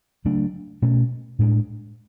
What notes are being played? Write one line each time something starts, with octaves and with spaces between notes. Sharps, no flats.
C#3 F#3 A3 D4
B2 A3 C#4
A2 G#3 D4